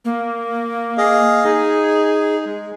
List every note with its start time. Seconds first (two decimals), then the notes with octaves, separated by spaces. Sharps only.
0.05 A#3
0.98 G#4 D#5 F5
1.44 D#4 G#4
2.46 G#3